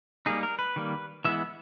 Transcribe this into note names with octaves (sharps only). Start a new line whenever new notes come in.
G3 A#3 D#4 G#4
A#4
B4
D#3 G3 A#3
E3 G#3 B3 E4 E5